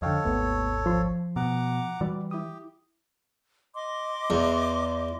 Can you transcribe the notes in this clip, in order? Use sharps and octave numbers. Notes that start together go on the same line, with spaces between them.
F2 D3 A4 C#5 D#5 F5 G5
G#1 D#2 A3 B3
F3 C6
B2 F#5 A#5 D6
E3 G3 F#4 D5
E4 G4 D#6
D#5 C6 D6
E2